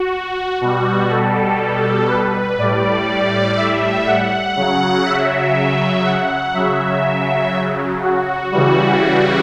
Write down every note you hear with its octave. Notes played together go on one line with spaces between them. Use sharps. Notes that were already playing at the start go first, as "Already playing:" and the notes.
Already playing: F#4
B2 G3 F#4
A4
B4
A2 G3 D5
E5
F#5
C#3 F#3
E5
F#5
C#3 F#3 E5
F#4
C#3 E3 G3 F#4